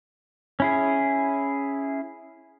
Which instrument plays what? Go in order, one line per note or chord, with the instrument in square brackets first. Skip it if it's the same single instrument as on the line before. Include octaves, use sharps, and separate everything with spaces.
[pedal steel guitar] C#4 E4 G#4